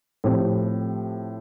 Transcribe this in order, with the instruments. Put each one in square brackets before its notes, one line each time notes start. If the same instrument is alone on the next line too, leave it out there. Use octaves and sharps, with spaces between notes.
[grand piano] A2 F3 C4 G4